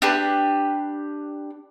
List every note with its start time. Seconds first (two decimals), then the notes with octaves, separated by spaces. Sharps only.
0.02 D4 G4 B4